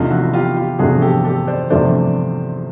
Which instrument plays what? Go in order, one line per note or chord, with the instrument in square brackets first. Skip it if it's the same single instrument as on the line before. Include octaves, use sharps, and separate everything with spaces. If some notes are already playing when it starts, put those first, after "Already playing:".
Already playing: [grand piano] E2 C3 F3 A3 D4 [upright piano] D#4 F4
[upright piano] E4 F#4
F4 G4
F4 G4
[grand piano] E2 C3 F3 A3 D4 [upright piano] F#4 G#4
[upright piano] G4 A4
G4 A4
C5 D5
[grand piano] E2 C3 F3 A3 D4 [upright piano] C5 D5